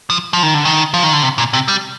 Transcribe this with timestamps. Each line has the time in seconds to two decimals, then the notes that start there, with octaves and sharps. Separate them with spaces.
0.10 F3
0.33 F3
0.43 D#3
0.54 D3
0.65 D#3
0.94 F3
1.03 D#3
1.13 D3
1.23 C3
1.38 A#2
1.53 C3
1.68 G3